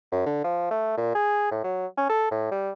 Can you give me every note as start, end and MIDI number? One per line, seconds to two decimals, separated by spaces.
0.12 0.22 42
0.26 0.42 50
0.44 0.70 53
0.71 0.92 57
0.97 1.14 46
1.15 1.50 68
1.51 1.60 45
1.64 1.86 54
1.97 2.09 61
2.09 2.28 69
2.31 2.50 45
2.51 2.72 55